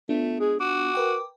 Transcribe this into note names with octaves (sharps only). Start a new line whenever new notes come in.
A3 B3 D4 F4
G#3 G#4
F#4 D6
A#4 B4 G5